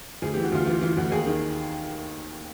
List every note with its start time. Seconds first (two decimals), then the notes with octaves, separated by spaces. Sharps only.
0.22 D2 G#4
0.33 E3 G4
0.44 F#4
0.52 D2 F4
0.66 E3 F4
0.81 E3 F4
0.97 D2 F#4
1.12 D#2 G#4
1.26 D#3